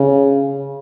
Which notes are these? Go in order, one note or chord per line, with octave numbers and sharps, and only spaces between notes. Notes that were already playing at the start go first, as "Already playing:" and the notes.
Already playing: C#3